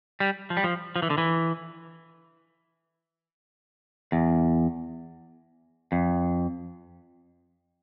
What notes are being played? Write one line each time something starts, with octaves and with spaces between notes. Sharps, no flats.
G3
F3
G3
F3
F3
E3
D3
E3
E2
F2